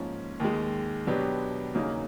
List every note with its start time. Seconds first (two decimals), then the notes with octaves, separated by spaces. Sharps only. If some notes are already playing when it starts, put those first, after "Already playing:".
Already playing: G#2 F3 A#3 C#4
0.40 D#2 D#3 G#3
1.07 B2 F#3 B3 D4 G4
1.75 E2 C#3 F#3 A#3 D#4